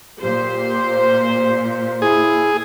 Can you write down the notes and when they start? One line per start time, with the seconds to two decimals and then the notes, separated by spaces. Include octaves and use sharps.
0.21 A#2 G4 C5
2.02 E4 G#4